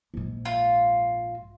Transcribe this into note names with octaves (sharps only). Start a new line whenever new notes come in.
A#1 G#2
F4